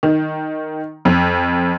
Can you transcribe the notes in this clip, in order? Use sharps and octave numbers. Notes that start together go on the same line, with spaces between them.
D#3
F2